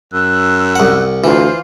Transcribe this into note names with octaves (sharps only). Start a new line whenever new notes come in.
F#2 E6 F#6
C2 F#5
D2 E3 F4 C5